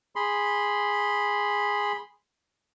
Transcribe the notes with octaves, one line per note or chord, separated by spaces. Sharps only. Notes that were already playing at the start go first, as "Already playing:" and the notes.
G#4 B5 C6